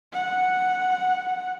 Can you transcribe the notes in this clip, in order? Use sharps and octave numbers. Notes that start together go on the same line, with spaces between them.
F#5